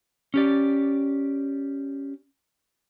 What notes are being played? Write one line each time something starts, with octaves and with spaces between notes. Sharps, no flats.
C#4 G4 D5